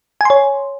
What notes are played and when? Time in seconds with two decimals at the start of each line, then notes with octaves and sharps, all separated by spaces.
0.21 G#5
0.25 C6
0.30 C#5